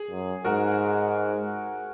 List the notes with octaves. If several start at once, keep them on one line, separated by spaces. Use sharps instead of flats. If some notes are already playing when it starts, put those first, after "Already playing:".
Already playing: G#4
F#2
G#2 F#4 A#4